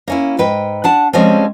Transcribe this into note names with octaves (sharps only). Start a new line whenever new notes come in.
A#3 C#4 E4
G#2 B4 G5
D4 F#5 A5
F3 G3 G#3 C4 C#4